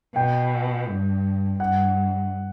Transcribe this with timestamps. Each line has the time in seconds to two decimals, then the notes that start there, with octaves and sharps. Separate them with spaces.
0.16 B2 G5
0.88 G2
1.60 G2 F#5